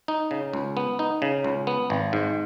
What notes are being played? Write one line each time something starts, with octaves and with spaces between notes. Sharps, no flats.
D#4
C#3
C#2
B3
D#4
C#3
C#2
B3
G#1
G#2